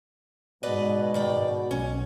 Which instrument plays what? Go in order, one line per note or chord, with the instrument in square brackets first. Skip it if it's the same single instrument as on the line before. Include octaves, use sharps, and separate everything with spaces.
[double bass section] G#2 [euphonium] B2 [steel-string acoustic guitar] B4 D5 D#5
[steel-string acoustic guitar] D#3 D5 G5
[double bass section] B1 [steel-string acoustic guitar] C#4